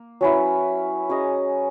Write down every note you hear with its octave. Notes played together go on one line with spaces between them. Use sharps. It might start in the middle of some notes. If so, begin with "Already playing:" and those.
Already playing: A#3
F#3 C#4 E4 B4
F#3 C#4 G#4 D#5